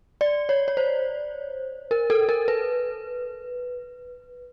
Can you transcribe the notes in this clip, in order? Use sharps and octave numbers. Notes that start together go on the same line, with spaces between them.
D5
C#5
C#5
C5
A#4
A4
A#4
B4